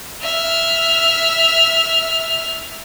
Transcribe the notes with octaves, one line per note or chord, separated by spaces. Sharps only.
E5 F6